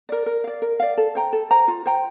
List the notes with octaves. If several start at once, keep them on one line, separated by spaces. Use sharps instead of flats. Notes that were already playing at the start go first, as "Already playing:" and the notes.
A#4 D5
A#4
D5 F5
A#4
D5 F5
A4
C5 G5 A#5
A4
C5 G5 A#5
F4
C5 G5 A#5